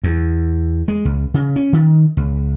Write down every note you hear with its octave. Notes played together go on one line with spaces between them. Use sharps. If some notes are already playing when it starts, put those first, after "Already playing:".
E2
G#3
C#2
C#3
C#4
D#3
C#2